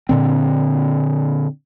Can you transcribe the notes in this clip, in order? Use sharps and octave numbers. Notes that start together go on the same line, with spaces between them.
A#2 D3 C4